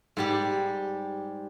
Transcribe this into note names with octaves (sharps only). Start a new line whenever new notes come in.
G#2 G3 G4